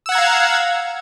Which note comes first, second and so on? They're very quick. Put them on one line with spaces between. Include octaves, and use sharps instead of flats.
E6 F#5 G#6 A#5 F5